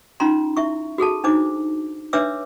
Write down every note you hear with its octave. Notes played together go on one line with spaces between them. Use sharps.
C#4 D#4 F4 A#5 C6
E4 E5 C#6
F#4 G#4 A4 A5
D4 D#4 C5 D6
D4 B4 C#5 E5 D6 E6